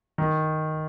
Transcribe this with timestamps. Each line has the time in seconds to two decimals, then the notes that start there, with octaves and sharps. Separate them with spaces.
0.18 D#3